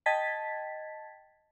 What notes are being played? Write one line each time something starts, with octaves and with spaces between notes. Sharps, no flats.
D#5 G5 A5 G#6 A6 B6